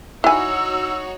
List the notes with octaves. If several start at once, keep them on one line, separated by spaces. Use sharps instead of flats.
D#4 E4 F#4 C#5 G#5 E6